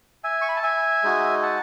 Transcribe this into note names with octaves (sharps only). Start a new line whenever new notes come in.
E5 G#5
C#6
B5
A5
E5 G#5
G#3 D#4 F#4
F#5 A5